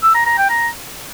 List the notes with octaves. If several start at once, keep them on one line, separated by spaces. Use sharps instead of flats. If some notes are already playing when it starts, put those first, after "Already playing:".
E6
A#5
A#5
G5
A#5